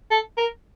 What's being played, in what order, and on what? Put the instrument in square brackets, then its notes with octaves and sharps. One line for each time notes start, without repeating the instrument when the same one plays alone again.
[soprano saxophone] A4
A#4